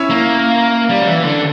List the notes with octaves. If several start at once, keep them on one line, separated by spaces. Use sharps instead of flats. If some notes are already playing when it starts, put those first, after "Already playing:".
Already playing: C#4 E4
A#3
G3
F#3
E3
D3